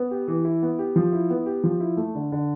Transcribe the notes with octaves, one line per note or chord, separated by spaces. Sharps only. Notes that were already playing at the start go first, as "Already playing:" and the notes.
Already playing: B3
G4
E3
E4
B3
G4
F3
E4
B3
G4
F3
E4
A3
D3
D3